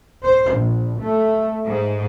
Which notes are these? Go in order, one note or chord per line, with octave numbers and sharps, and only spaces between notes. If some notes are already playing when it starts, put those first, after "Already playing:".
C5
A#1
A3
G#2